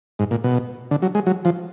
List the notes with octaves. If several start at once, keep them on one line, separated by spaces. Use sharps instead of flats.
G#2
A#2
B2
D3
F#3
G#3
F#3
F3